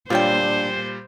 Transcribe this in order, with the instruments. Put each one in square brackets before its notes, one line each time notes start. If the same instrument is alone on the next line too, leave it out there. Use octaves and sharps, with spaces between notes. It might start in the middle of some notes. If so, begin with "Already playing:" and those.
[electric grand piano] A#2 G3 G6 [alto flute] D4 [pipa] F4 C#5 G5 [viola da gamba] C5